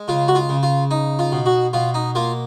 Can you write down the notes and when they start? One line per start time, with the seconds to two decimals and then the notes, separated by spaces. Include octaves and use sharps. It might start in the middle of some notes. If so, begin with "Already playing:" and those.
Already playing: G#3
0.08 C#3 F4
0.28 F#4
0.35 F4
0.49 C#3
0.63 F4
0.91 D#4
1.19 F4
1.32 B2
1.46 F#4
1.73 B2 F4
1.94 D#4
2.15 A#3 F4